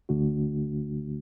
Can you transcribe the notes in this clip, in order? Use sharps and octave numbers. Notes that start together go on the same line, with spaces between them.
D2 D3 A3 D4 F#4